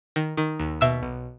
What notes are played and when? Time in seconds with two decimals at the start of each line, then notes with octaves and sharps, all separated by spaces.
0.16 D#3
0.37 D#3
0.60 D#2
0.81 B2 E5 E6
1.03 B1